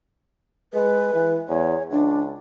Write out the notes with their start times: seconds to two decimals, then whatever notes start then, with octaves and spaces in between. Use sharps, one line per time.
0.74 G#3 B4
1.14 E3
1.49 E2 C#5
1.91 C#2 D4